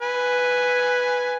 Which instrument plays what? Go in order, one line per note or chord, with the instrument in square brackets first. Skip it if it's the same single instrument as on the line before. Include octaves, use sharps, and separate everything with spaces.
[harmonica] B4 G#5